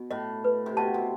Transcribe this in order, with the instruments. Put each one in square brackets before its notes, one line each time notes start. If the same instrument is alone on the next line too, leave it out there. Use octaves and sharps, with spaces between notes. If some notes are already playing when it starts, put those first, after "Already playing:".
Already playing: [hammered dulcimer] B2
[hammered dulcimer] A2 [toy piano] D#5
[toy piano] B4
[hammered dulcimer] C3
[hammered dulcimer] B2 [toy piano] A5
[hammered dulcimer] C3